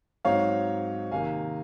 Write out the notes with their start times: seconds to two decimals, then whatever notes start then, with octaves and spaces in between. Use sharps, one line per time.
0.25 G#2 F#3 C4 D#4 C#5 F5
1.12 C3 D#3 A#3 F5 G#5